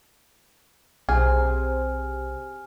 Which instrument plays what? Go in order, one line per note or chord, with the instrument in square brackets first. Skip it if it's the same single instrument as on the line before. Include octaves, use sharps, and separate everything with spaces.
[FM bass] B1 [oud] C3 [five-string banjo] G#4 [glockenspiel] G#5 F6